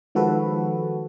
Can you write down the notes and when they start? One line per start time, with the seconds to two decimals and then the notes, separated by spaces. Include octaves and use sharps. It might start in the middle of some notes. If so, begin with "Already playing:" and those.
0.15 D#3 F3 G#3 F#4 A4 B4